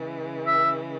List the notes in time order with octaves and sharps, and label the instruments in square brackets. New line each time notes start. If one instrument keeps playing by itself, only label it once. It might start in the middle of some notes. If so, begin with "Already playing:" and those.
Already playing: [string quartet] C#3 E3 G#3
[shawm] E5